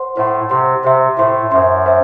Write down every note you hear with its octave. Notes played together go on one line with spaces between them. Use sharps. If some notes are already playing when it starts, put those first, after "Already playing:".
Already playing: C5 F#5 C6
A2 C5 F#5 C6
C3 C5 F#5 C6
C3 C5 E5 C6
A2 C5 E5 C6
F#2 C5 E5 C6
C5 E5